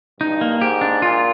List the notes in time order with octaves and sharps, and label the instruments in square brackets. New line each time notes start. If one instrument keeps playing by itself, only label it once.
[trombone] G2 [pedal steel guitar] D#4
[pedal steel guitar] A#3
[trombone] G#2 [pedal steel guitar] G4
[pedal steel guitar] D4
[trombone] A#2 [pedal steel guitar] F4